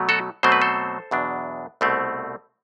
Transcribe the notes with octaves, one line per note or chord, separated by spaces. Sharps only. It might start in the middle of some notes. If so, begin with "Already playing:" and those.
Already playing: B2 F#3 A3
F#4 A4
B2 F#3 A3 C4 C5
B4
A4 C5
E2 B2 F#3 B3 D4
C2 B2 A3 C4